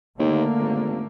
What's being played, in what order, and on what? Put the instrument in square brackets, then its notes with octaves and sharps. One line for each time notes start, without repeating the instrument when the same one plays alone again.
[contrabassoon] D#2 [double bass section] D3 A3 A#3
[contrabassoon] G#1